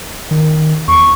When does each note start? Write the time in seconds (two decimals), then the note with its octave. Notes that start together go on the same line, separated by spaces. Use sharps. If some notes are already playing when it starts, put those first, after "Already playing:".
0.31 D#3
0.88 E2 C#6